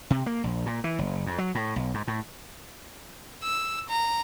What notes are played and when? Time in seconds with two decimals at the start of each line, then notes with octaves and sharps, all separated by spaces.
0.10 C3
0.26 A#3
0.44 A#1
0.66 A#2
0.84 E3
0.99 F#1
1.26 F2
1.38 F#3
1.55 A2
1.76 B1
1.94 G#2
2.07 A2
3.43 E6
3.89 A#5